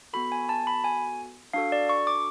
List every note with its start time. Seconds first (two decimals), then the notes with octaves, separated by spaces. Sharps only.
0.13 B3 F#4 A4 B5
0.32 G#5
0.49 A5
0.67 B5
0.84 G#5
1.54 D4 F#4 A4 F5
1.72 D5
1.89 C#6
2.07 D6